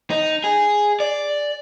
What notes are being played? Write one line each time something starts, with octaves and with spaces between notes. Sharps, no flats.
D#4
G#4
D5